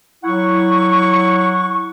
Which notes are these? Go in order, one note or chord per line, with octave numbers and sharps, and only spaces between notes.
F#3 E4 F#5 C#6